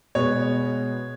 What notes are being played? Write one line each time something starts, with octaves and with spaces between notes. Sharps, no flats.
B2 G#3 B3 C#5